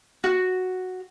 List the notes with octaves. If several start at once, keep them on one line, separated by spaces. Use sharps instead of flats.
F#4